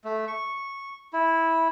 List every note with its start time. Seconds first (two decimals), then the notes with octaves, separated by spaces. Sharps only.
0.04 A3
0.27 C#6
1.13 E4